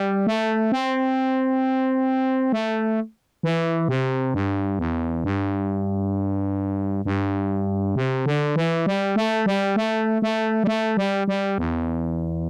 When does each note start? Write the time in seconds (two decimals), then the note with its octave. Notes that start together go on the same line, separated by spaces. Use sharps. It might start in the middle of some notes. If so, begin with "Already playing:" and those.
Already playing: G3
0.27 A3
0.72 C4
2.52 A3
3.43 E3
3.88 C3
4.34 G2
4.79 E2
5.24 G2
7.05 G2
7.96 C3
8.26 D3
8.56 E3
8.86 G3
9.16 A3
9.46 G3
9.76 A3
10.22 A3
10.64 G3
10.67 A3
10.97 G3
11.28 G3
11.58 E2